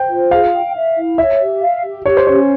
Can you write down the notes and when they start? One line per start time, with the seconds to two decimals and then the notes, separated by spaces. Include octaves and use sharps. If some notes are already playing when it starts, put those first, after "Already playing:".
Already playing: C5 G5
0.09 F4
0.31 G#4 F5
0.53 G5
0.75 E5
0.96 E4
1.18 C#5 E5
1.40 G4
1.61 F5
1.84 G4
2.06 G4 C#5
2.17 C5
2.27 C#4 C#5